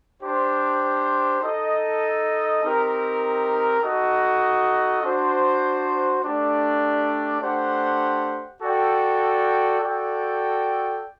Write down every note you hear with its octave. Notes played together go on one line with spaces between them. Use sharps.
D4 G4 C5
D#4 A4 D#5
C4 D#4 G4 A#4
D#4 F#4 A4 D#5
D4 F#4 C5
A3 D4 G4 D5
A3 D4 G4 C5 F#5
F#4 A4 D5 G5
F#4 A4 D5 G5